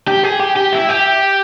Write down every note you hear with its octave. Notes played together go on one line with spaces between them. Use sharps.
G4
G#4
G4
G4
E4
G4